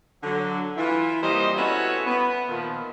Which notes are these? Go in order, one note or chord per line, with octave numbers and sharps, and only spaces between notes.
D3 F#3
E3 E4 F4
G3 A#3 C4 C5 D#5
B3 C#4 E4 F#4 A4 C#5
B3
A#2 D#3 F3